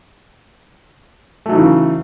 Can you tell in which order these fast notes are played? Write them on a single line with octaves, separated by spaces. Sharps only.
A3 F#3 D#4 E3 C#3